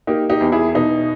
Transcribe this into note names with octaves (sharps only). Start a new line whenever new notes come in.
A#3 D#4 G4
D#4 G4
E2
E4 G#4
B2 D#4